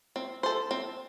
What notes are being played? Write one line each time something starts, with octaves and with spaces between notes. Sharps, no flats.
C4
A4 C5
C4